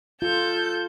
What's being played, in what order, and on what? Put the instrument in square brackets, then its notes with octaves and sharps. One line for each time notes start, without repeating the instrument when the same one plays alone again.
[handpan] F4 [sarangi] A4 [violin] G6